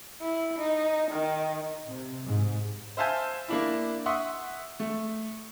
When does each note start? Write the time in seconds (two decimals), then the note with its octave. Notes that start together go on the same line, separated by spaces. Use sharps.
0.21 E4
0.59 D#4
1.11 D#3
1.87 C3
2.26 G#2
2.97 C5 E5 F5 G#5 A5 G6
3.48 A#3 D4 E4
4.06 E5 F#5 C6 C#6 D#6
4.80 A3